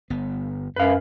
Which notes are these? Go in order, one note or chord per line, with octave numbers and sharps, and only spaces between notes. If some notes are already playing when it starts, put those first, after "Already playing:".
G1 B3
F#2 B4 F5